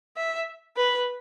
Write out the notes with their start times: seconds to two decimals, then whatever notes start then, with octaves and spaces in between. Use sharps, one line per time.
0.17 E5
0.77 B4